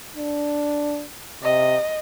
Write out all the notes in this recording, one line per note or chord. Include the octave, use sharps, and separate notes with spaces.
D4
C3 D#5